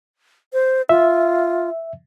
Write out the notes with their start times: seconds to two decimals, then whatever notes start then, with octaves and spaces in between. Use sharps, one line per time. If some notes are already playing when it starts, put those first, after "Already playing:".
0.53 C5
0.89 F4 E5